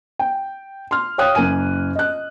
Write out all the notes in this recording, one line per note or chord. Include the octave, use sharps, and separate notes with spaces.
G5
C6 F6
C#5 F5 G5 D#6 F#6
F#1 A#3 G#5 D#7
D#5 F#6